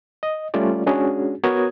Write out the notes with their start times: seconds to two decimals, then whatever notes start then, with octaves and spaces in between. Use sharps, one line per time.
0.23 D#5
0.54 G3 A3 C#4 F4 D5
0.86 G#3 C#4 D4 F#4 G#4
1.44 B3 F#4 A#4 C#5 D#6 G#6